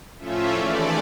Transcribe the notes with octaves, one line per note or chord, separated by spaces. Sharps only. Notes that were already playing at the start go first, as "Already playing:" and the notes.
A2 F3 A3 C#4 F4 E5
D#2 C#3 E3 A3 D5